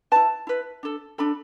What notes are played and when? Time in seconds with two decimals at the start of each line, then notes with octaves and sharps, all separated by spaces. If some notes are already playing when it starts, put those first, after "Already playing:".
0.12 E4 B4 A5
0.47 E4 B4
0.83 D4 A4
1.18 D4 A4 B5